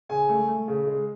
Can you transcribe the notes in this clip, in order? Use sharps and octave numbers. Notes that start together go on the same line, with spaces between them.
C#3 G#5
A3
A3
C#3
G#3